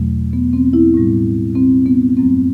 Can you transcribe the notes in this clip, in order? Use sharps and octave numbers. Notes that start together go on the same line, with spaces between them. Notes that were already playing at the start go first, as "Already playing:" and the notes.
Already playing: E2 B2 F#3 A3
B3
C4
E4
A2 G3
C4
B3
F#2 F#3 A3 C4